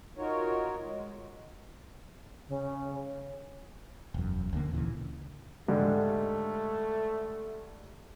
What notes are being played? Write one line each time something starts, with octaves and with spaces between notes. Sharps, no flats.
D#4 F4 F#4 A#4 C#5
G#3
C#3
E1 F#2
D2 D3 A#3
D2 A#2 C#3 E3
G#2 D3 G3 A3